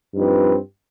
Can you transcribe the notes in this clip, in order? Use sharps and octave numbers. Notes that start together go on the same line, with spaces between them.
G2 F3 C4 D#4 B4